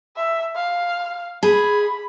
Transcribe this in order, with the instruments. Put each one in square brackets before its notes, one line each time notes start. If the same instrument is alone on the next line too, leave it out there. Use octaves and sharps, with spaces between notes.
[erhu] E5
F5
[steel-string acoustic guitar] G#4 [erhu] B5